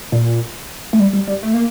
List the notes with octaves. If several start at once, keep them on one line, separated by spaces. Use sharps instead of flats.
A#2
A3
G3
G3
G3
A3
A#3